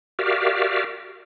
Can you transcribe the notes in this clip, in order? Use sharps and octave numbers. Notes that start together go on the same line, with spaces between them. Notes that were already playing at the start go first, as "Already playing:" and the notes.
F#4 G4 A#4 D5 E5 F5